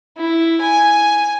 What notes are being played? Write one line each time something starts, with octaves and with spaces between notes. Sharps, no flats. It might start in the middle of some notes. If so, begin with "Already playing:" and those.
E4
G#5